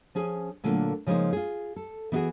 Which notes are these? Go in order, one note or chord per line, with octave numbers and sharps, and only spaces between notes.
F3 C#4 G#4 G#5
A#2 D3 F#3 A3 A#3 F4
C#3 F3 G3 G#3 A#3 D#4
F4 G#4
A4
E3 B3 D#4 E4 F#4 G#4